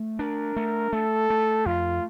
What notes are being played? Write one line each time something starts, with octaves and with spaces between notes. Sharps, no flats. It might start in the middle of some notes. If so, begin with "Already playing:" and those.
Already playing: A3
D4 A#4
A3
A3 A4
A3
F2 F4